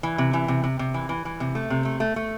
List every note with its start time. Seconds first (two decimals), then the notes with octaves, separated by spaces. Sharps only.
0.03 E3
0.18 C3
0.33 E3
0.48 C3
0.64 C3
0.79 C3
0.94 E3
1.09 E3
1.25 E3
1.40 C3
1.55 A3
1.70 C3
1.85 A3
2.00 A3
2.16 A3